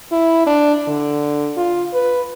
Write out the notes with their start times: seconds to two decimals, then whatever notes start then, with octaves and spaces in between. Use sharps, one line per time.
0.12 E4
0.47 D4
0.88 D3
1.57 F4
1.94 B4